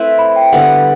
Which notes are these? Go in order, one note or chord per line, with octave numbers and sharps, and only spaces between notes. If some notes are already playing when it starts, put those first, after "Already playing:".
Already playing: A3 C4 E4 B4 E5
B5
G5
D3 G3 B3 F#5